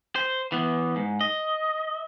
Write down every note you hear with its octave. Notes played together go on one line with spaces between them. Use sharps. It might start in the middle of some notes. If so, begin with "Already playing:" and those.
C5
E3 B3
G#2
D#5